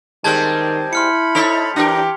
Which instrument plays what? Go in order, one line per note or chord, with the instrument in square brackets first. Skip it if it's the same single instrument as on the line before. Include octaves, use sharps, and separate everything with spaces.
[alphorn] D#3 [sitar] G3 G#3 C4 [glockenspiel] A5 G6 G#6
[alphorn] E4 [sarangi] B5 [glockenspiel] C6 F6 C#7
[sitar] D#4 A4 C#5 [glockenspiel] B6 F7
[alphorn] E3 [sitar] D4 A#4 [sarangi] G4